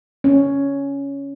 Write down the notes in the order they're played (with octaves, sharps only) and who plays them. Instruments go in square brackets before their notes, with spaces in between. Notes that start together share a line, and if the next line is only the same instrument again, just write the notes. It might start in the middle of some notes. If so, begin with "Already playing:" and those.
[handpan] C#4